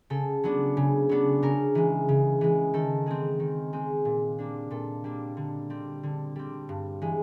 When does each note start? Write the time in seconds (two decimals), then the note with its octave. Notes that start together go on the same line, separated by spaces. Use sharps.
0.10 C#3 A4
0.44 F#3 B3 D4
0.77 C#3
1.09 F#3 B3 D4
1.42 C#3 A#4
1.75 E3 G#3
2.09 C#3
2.41 E3 G#3
2.74 D#3 A4
3.06 G#3 C4 G#4
3.40 D#3
3.73 G#3 C4
4.05 A#2
4.39 G3 A#3 D4
4.71 A#2 A4
5.04 G3 A#3 D4
5.37 D3
5.70 G3 C4
6.03 D3
6.36 G3 C4
6.69 G2
7.02 E3 G#3